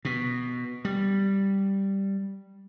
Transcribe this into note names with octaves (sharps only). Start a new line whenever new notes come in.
B2
G3